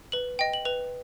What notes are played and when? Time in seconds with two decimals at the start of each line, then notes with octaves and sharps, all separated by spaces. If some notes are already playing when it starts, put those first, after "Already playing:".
0.12 B4 F#7
0.39 D#5 G5
0.53 F#7
0.65 B4 F7